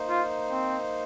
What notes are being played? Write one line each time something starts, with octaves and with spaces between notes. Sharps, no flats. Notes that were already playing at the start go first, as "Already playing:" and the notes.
Already playing: A#3 D#4 C5
F4
C4